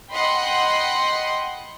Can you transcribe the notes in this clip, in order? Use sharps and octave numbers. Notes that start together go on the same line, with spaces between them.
D#5 F#5 G5 B5 C6